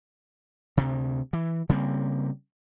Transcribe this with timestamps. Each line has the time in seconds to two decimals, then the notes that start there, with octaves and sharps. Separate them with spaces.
0.77 D2 C3
1.33 E3
1.69 C#3 G3 A#3 C4